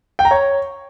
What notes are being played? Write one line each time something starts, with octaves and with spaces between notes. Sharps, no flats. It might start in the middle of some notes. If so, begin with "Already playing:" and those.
G5
A#5
C#5